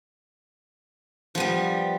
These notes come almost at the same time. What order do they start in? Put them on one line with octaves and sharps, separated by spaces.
F3 B3 G3